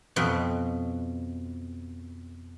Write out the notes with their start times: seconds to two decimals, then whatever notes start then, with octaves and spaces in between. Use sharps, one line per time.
0.16 F2 B2 C4